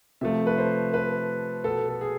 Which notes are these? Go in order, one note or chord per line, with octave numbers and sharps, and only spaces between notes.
C3 F3 A3 E5
B4
C5
B4
B2 B3 A4
A4
G#4